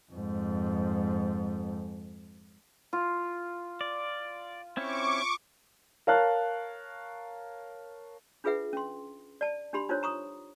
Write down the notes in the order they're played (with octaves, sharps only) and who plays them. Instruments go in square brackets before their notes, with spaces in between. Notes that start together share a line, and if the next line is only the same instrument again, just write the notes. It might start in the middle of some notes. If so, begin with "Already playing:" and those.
[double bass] F2 G#2
[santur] F4
[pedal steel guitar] D5
[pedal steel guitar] C4 C#4 E4 [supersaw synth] C#6 D6
[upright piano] A#4 C#5 F5 A5 F6 F#6
[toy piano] D4 F4 G#4 B4 E5 F#5
C#4 C6
D5 A5
D4 D#4 G4 B5 C6
D4 D#4 F4 A#4 C5 C#5
A#5 C#6 D#6